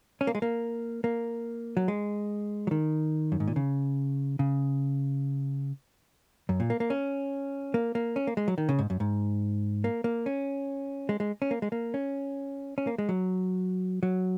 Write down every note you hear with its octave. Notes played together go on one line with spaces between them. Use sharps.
C#4
A#3
G#3
A#3
A#3
F#3
G#3
F#3
D#3
F#2
G#2
A#2
C#3
C#3
F#2
A#2
A#3
A#3
C#4
A#3
A#3
C#4
A#3
G#3
F#3
D#3
C#3
G#2
F#2
G#2
A#3
A#3
C#4
G#3
G#3
C#4
A#3
G#3
A#3
C#4
C#4
A#3
G#3
F#3
F#3